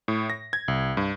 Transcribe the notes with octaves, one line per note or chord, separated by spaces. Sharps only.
A2
A#6
G#6
C2
G2